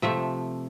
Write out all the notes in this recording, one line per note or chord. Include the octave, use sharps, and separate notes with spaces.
C3 F3 A3 E5